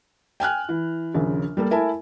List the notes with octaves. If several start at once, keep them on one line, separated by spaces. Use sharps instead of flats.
G5 G#5 F6 F#6
E3
A#1 D#2 C#3
G3 A#3 A4
A3 E4 A#4 E5 G#5 A5